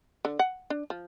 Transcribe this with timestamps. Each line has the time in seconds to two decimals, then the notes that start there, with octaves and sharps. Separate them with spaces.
0.25 D3
0.39 F#5
0.70 D4
0.90 F3